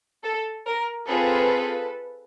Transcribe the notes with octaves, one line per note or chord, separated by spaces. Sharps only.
A4
A#4
C4 F4 G#4 A4 B4